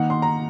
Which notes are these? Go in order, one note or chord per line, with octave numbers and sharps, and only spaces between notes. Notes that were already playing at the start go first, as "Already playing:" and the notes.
Already playing: D#3 A#3 D#4 F#5
C6
A#5